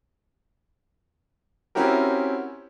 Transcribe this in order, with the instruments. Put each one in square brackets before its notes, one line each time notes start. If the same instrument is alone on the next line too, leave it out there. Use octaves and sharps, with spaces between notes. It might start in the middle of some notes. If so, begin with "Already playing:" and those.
[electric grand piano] C4 C#4 E4 F#4 G4 A#4